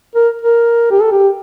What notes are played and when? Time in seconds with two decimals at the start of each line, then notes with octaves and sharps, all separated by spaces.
0.15 A#4
0.42 A#4
0.91 G4
1.01 A4
1.12 G4